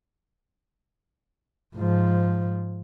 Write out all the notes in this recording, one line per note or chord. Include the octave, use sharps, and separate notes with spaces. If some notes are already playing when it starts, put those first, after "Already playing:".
G#2 F3